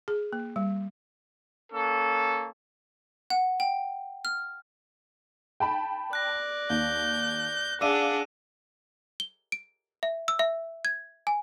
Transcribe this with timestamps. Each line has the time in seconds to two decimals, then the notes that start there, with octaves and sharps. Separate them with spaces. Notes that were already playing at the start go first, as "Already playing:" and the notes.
0.08 G#4
0.33 A#3
0.56 G3
1.73 A#3 C#4 A4
3.30 F#5
3.60 G5
4.25 F6
5.60 G5 A5 B5
6.13 D5 F#6 A#6
6.70 D#2 G6
7.81 D4 G#4 D5 F5 F#5 D6 E6 D#7
9.20 G7
9.52 D7
10.03 E5
10.28 E6
10.39 E5
10.85 G#6
11.27 G#5